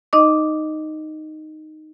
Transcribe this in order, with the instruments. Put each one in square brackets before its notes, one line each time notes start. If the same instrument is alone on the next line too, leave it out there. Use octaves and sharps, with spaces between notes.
[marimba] D#4 D#5 D6